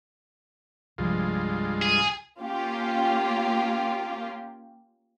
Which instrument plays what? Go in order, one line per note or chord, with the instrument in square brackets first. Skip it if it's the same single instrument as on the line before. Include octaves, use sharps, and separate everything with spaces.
[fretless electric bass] C2 F3 [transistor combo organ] G2 G#3 F4
[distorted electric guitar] G#4
[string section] A#3 C#4 F4 G4